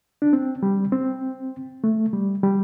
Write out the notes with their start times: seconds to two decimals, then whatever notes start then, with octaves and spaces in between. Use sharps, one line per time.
0.22 D4
0.33 C4
0.63 G3
0.92 C4
1.84 A3
2.13 G3
2.43 G3